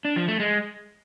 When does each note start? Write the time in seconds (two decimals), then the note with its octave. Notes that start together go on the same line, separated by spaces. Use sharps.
0.05 D4
0.16 F3
0.28 A3
0.40 G#3